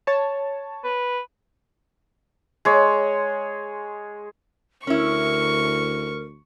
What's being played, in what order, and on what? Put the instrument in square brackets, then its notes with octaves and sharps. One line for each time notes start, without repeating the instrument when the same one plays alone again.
[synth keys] C#5 A5
[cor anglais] B4
[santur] G#3 C#5
[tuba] D2 [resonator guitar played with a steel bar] C#4 E4 [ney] A#4 [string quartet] C#6